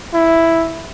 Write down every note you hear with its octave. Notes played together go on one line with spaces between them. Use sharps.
E4